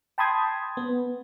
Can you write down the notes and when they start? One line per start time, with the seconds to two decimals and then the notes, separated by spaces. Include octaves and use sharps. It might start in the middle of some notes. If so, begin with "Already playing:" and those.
0.18 G5 A5 B5 C6 D#6 G#6
0.77 B3